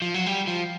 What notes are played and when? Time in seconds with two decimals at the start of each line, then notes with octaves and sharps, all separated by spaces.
0.02 F3
0.14 F#3
0.26 G3
0.47 F3